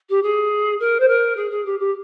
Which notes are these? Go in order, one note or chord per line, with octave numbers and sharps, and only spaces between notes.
G4
G#4
A#4
C5
A#4
G#4
G#4
G4
G4